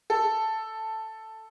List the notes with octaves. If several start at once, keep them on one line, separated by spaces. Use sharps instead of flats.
A4